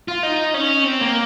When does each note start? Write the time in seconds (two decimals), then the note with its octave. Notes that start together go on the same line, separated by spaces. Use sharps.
0.08 F4
0.23 D#4
0.54 C#4
0.84 C4
1.01 A#3